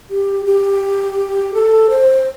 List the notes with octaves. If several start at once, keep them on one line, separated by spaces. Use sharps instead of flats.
G4
G4
A4
C5